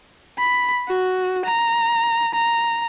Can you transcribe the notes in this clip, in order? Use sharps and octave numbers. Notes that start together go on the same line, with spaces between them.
B5
F#4
A#5
A#5